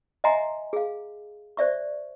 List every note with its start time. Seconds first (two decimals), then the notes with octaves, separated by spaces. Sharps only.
0.24 D#5 E5 F#5 G#5 A#5 C6
0.73 G#4 F5
1.57 C5 D5 E5 C#6